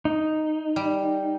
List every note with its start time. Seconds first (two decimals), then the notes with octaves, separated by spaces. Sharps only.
0.05 D#4
0.76 G3